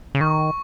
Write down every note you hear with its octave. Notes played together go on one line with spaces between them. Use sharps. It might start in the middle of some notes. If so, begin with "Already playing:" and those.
C#3
D#3 C#6